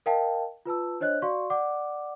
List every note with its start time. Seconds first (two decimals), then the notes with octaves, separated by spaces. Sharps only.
0.06 A#4 D#5 F5 G5 A5
0.65 F4 B4 A5 E6
1.00 D4 C5 C#5 D#5 F#6
1.22 F#4 D5 F5 C6 C#6
1.50 D5 F#5 D6